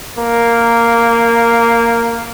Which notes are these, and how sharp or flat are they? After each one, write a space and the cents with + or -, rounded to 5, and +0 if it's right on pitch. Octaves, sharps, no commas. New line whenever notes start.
A#3 -5